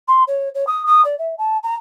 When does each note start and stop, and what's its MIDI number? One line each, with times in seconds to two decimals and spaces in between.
0.08 0.23 84
0.27 0.49 73
0.54 0.64 73
0.67 0.85 87
0.86 1.03 87
1.04 1.18 74
1.18 1.35 76
1.38 1.57 81
1.63 1.74 82